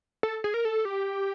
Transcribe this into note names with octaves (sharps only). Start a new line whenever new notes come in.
A4
G#4
A#4
A4
G4